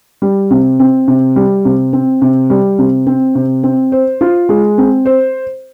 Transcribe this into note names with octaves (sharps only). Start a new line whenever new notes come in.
G3
C3
C4
C3
G3
C3
C4
C3
G3
C3
C4
C3
C4
C5
F4
G#3
C4
C5